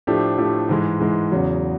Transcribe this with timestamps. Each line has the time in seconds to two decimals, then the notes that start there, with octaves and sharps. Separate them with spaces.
0.07 A2 F3 A3 D4 G4
0.38 A2 F3 A3 D4 G4
0.69 G#2 E3 G#3
1.00 G#2 E3 G#3
1.32 E2 C#3 F#3